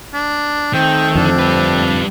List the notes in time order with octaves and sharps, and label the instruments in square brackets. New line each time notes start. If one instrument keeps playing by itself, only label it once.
[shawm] D4
[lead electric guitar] D#3 [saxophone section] A3 C4 [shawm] G5
[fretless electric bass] F2 D3 [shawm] D4
[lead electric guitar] G3 B4